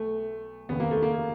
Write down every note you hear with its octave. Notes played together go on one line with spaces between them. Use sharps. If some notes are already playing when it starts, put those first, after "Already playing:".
Already playing: B1 A3
F1 D#2 C#3 B3
A#3
A3
A#3